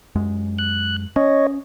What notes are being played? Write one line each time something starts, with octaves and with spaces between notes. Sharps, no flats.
F#2 G#3
F#6
C#4 C#5 D#5